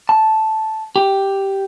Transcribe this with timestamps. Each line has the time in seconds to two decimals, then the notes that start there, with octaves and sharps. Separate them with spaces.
0.09 A5
0.96 G4